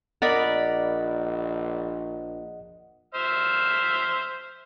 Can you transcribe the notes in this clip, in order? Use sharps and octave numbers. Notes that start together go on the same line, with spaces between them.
A#1 A#4 D5 D#5 F#5 B5
C5 E5 F6